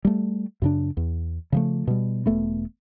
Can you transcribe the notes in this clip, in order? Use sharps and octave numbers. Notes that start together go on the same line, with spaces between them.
G3 A3
F#2 C#3 D4
E2
C#3 F3 A3
B2 G3
E1 A3 B3